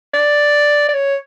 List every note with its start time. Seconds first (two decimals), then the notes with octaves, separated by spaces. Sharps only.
0.14 D5
0.89 D5
0.94 C#5